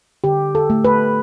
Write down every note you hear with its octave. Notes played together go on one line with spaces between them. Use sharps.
D3 G4
A4
A3
B4